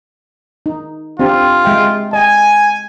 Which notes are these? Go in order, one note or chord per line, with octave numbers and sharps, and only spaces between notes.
D#4
C4 D4 F4 G4
G#3 E5 G5
D#5 G5 G#5